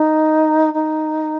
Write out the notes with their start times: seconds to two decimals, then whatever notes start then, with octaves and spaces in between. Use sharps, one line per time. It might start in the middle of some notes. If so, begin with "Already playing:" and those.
Already playing: D#4
0.73 D#4